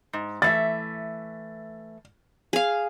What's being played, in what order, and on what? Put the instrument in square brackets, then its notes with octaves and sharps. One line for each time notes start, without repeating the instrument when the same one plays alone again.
[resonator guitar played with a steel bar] G#2
[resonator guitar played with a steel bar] E3 A3 E5 [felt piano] A6
[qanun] G#4 F5